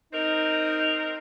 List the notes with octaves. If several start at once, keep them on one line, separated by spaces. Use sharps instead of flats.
C4 D#4 A#4